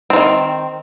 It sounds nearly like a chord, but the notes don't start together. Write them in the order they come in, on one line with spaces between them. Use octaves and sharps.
C4 E3 D#3